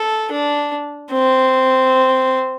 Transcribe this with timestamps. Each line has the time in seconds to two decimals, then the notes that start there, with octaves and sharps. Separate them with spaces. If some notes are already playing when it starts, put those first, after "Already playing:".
Already playing: A4
0.31 D4
1.12 C4